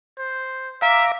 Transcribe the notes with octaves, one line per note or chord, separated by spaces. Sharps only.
C5
E5 F5 A#5 D6